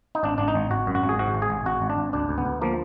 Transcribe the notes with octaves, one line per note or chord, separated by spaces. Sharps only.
D#4
G#1 D4
G#1 D4
D#4
G#1
G#1 F#4
F#2
F#4
G#1
G#4
G#2 F#4
G#1
G#4
G#1
G#1 F#4
G#1
D4
G#1
D2 D4
D2
B3
D2
F3 A#3